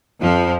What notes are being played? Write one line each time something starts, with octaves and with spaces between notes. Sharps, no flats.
F2 F3